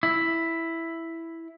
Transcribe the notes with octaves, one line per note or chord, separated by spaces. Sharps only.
E4